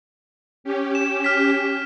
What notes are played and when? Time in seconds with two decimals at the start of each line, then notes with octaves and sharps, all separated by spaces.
0.64 C#4 G4
0.95 E7
1.24 F6 B6